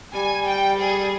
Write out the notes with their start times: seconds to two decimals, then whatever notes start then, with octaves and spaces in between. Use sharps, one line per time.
0.13 G3 G#5
0.46 G5
0.79 G#4